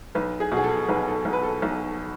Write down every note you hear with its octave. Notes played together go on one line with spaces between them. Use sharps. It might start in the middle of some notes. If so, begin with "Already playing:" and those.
B1 B4
G#4
B2
G#4
A4
B1 B4
A4
B1
B4
A4
B1